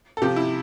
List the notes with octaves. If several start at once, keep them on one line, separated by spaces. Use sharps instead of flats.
A4
C3 F3 G4
E4